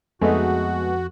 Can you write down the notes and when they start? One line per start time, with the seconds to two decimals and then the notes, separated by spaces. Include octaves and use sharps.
0.21 F2 G#3 A3 B3 D#4 F#4 G#4